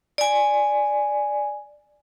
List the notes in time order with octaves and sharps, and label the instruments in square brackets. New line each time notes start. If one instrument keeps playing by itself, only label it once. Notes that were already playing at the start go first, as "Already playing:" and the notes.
[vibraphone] D5 G#5